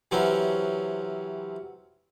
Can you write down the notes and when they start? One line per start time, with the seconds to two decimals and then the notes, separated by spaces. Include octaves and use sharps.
0.11 C3 E3 F#3 C4 C#4